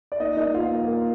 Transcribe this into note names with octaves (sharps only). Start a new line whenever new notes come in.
D5
A#3 D#4 D#5
A#3 D#4 D#5
A#3 F4 F5
A#3
A#3